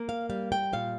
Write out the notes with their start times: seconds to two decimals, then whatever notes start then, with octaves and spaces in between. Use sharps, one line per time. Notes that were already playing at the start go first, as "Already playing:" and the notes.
Already playing: A#3
0.09 F5
0.30 G3 F5
0.52 G5
0.73 A#2 F5